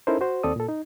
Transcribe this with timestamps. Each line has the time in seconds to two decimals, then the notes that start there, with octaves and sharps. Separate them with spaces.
0.07 C#4 D#4 E4 A4 A#4 C5
0.21 F#4 C5
0.43 D#2 C4 A4 D5 D#6
0.56 A#2 A4
0.68 D#4